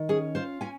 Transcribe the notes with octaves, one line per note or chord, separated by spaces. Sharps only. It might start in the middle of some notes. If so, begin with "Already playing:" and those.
Already playing: D#3
C#4 G#4
F4 C5
C#4 G#5